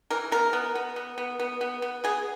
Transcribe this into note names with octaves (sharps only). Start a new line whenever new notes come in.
E3 A#4
B3 A#4
B3
B3
B3
B3
B3
B3
B3
B3 G#4